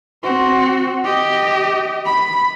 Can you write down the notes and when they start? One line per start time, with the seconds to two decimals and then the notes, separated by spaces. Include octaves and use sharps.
0.23 C4 F#4
1.04 G4 D#5
2.06 B5